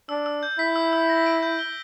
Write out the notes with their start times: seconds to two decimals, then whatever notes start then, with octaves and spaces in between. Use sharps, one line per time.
0.09 D4 E6
0.26 E6
0.43 G6
0.59 E4 B6
0.76 E6
0.93 E6
1.09 A#6
1.26 D7
1.42 G6
1.59 G7